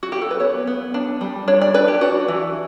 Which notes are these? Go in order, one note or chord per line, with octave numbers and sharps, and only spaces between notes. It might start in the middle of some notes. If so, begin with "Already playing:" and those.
F#4
G4
A4
B4
B3 C#5
B3
D4
G3
D4 C#5
D5
D4 B4
G4
D4 F#4
E3